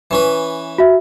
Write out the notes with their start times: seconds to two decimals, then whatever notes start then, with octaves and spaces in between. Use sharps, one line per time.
0.11 E3 C#4 B4
0.78 F#4 E5